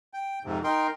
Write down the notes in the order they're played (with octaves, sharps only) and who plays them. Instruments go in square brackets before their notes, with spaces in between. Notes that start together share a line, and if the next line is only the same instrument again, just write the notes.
[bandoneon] G5
F2 G#2 C3
D#4 A#4 G5 C6